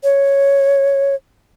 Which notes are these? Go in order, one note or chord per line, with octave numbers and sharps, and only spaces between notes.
C#5